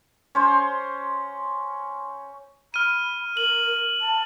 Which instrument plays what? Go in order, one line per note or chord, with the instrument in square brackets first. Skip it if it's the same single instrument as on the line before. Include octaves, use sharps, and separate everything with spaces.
[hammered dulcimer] C#4 C5 C6
[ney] B5 [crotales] F6 D#7
[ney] A#4 [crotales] F#7
[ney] A5